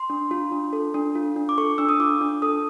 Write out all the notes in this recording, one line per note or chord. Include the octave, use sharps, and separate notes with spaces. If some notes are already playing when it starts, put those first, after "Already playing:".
Already playing: C6
D4
F4
D4
A4
D4
F4
D4
D6
A4 C#6
D4 E6
D#6
F4 D6
D4
A4 D#6